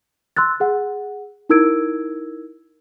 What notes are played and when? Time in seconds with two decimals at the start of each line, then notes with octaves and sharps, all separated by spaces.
0.36 C6 E6 F#6 A6
0.60 G#4 F#5
1.49 D#4 E4 A#4 E6 G#6 D7